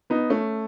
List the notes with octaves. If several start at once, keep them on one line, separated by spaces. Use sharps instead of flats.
B3 D#4
A3 C#4